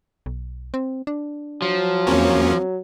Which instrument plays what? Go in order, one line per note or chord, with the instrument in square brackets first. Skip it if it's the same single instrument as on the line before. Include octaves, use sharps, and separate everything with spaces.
[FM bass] B1
C4
D4
[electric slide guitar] F3 [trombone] F#3
[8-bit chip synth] E2 A#3 C#4 [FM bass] C4